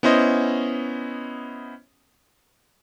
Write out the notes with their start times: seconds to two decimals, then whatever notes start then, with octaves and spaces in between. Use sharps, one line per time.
0.03 B3 C#4 E4 C5 D#5